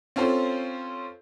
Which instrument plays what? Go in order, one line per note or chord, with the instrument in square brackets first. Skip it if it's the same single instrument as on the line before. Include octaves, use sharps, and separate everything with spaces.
[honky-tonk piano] C4 C#4 F4 A4 C5